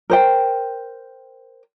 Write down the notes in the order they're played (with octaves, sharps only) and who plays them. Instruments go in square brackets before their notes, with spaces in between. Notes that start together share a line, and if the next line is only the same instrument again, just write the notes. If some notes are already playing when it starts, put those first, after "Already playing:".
[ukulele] A#4 C5 G5